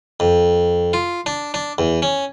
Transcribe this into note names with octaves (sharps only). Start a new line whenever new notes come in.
F2
F4
D4
D4
E2
C#4